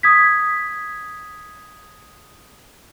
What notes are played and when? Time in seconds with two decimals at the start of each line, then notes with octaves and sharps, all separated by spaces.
0.03 D#6 G#6 B6